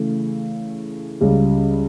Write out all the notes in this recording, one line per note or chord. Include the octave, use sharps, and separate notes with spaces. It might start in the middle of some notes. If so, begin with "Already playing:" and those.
Already playing: C#3 E3 A3
C#2 C#3 G3